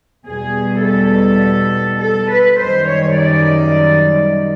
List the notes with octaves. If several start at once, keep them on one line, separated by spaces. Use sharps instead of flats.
E2 B2 G3 G#4
A4
A4
B4
F#2 D#3 G3 C5
C#5
D5